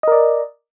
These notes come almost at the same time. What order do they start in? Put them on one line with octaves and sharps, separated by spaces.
D#5 A#4 D5